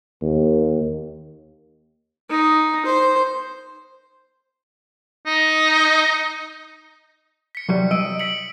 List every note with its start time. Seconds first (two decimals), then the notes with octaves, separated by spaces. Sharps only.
0.22 D#2
2.30 D#4
2.86 C5
5.26 D#4
7.55 B6 C#7
7.69 C2 F#3 G3
7.91 D#5 E6 D7
8.19 B6 C#7 F#7